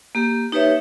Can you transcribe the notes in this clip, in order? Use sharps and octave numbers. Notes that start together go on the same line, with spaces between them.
A#3 G4
D#4 G4 B4 C#5 E5